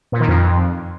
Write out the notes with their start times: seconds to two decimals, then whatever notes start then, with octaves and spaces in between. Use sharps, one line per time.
0.12 A#2
0.20 D#3
0.28 F2